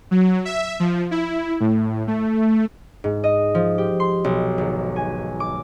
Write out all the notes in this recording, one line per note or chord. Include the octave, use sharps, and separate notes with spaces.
F#3
E5
F3
E4
A2
A3
G#2
D#5
F3
G4
C6
B1
G#1
G#5
D6